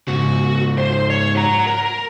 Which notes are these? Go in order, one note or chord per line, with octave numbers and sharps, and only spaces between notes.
G#2 C#3 F#4
C5
C#5
F#4 A#5
A#4